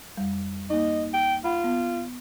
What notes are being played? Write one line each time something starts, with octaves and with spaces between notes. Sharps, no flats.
F2 G3
A#3 D#4 D#5
G5
F4 F#5 B5
B3